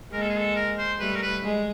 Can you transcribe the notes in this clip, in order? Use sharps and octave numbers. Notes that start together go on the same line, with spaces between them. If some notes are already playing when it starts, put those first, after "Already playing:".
G#3 A#3 A#4
A4
G#4
A4
A#4
C5
G3 A3 B4
A#4
B4
G#3